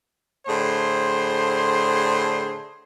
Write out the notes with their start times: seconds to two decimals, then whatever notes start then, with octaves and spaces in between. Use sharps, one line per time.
0.47 A2 D3 G#4 C5 C6